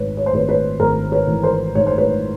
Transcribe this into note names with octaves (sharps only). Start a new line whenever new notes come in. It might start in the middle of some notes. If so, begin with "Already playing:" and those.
Already playing: G#1 G#2 B4 C#5
C#5
C5
G#1 B4 C#5
B4 C#5
G#1 A#4 C5
B4 C#5
E3
A#4 C5
G#2 C#5
C5
B4 C#5